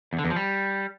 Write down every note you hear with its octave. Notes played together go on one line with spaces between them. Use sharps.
E2
D3
E2
F3
G3